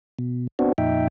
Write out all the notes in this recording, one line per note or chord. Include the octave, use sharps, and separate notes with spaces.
B2
B3 C4 D4 F#4
F2 A#2 D#4 E5 G5